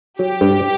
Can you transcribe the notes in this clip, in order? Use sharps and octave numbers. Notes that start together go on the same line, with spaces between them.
F#3 G4
G2